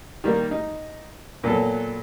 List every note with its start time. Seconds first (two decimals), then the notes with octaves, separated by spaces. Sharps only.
0.24 D#3 G3 A#3
0.51 D#4
1.44 A#2 F#3 B3 A4